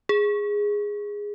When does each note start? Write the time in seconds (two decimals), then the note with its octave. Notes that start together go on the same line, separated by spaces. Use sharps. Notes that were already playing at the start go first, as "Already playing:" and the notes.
0.09 G#4